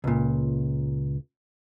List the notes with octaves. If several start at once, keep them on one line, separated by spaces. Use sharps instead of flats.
C#2 A#2